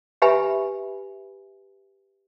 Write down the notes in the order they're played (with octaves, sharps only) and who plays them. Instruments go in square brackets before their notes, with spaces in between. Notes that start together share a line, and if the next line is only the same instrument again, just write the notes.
[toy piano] G4 B4 E5 G#5 B5